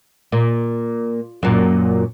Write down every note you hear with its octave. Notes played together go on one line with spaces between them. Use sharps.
A#2
F#2 A#2